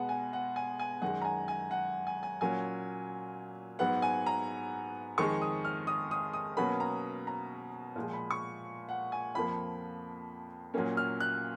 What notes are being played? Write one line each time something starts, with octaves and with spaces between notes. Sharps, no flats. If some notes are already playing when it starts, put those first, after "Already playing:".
Already playing: B2 G#3 B3 F#5
G#5
F#5
G#5
G#5
F#2 D#3 G#3 F#5
A#5
G#5
G#5
F#5
G#5
G#5
A#2 F#3 A#3 C#4 G#5
G#2 F#3 B3 F#5
G#5
A#5
F2 D#3 G#3 C#6
D#6
F6
D#6
D#6
D#6
B2 F#3 A#3 C#4 B5
A#5
A#5
A#2 F3 G#3
B5
C#6
F#5
G#5
F2 F3 A#3 B5
A#2 F#3 A#3 C#4
F6
F#6